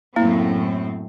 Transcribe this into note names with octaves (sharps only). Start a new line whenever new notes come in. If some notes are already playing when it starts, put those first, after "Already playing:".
F#2 A2 A#3 C4 E4